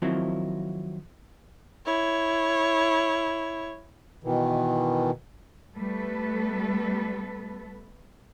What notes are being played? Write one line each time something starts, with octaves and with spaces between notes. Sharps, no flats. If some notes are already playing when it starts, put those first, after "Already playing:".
D#3 F3 F#3 A#3 C4 E4
E4 C#5
B2 D#3 E3
G3 A3 B3 A4 B4